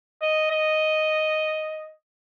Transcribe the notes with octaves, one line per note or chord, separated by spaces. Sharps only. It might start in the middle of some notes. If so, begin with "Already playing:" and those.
D#5
D#5